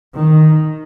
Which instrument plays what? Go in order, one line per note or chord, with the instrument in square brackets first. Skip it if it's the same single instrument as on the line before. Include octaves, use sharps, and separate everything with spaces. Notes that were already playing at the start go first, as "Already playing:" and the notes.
[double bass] D#3